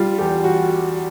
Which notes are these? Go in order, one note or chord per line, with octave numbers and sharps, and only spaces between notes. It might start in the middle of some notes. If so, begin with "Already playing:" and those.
Already playing: G3 F4
E2 G4
F#4